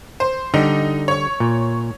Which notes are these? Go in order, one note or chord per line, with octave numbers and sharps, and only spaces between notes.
C5
D3 G3 D#4
C#5 C#6
A#2